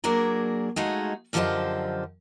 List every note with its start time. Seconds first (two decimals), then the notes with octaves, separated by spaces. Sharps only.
0.04 F#3 A#3 D4 G#4 A#4
0.76 G#3 A3 D#4 F4 F#4 G#4
1.33 F#2 D3 F3 G4 C5 D#5